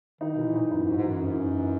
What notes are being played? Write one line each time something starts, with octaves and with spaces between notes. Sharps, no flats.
D#3 D#4
B2 E3
A#2
D#4
F#2 D#4
G#2
F#4
G#2
F#2 E3
F#2 E3
D#4
E3